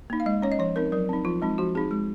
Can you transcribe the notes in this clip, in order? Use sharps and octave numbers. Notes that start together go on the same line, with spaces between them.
A#3 D#4
F5
G#3 D#5
C#4 C#5
D#5
F3 C#5
C4 D#4 A#4
F#3 A#4
C4 D#4
F3 F4
G#3 C4 D#4
F3 F#4
C4 D#4 G#4
G#3